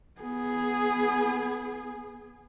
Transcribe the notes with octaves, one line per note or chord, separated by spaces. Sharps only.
B3 G#4